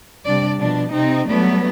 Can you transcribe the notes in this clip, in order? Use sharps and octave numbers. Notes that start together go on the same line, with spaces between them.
C3 G3 D4 D5
B2 F3 D4
C3 C4 D#4
F#3 G3 A3 B3 D4